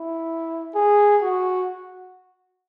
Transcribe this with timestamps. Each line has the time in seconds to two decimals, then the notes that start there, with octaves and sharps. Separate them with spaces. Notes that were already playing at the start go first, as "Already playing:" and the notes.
Already playing: E4
0.75 G#4
1.22 F#4